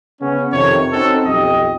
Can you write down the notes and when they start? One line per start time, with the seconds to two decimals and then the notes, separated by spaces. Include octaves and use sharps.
0.21 C#3 B3 C#4
0.53 F2 C3 D#3 C#5
0.92 C4 C#4 D#4 F#4 A4
1.26 B1 F2 G4 D#5